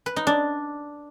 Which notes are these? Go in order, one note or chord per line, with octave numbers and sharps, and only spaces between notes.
B4
D#4
D4